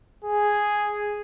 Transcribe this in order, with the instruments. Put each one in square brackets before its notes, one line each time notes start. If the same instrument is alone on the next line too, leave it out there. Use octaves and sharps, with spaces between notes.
[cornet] G#4